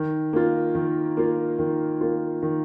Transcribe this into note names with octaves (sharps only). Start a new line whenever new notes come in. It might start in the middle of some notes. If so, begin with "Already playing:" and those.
Already playing: D#3
A#3 F4
D#3
A#3 F4
D#3
A#3 F4
D#3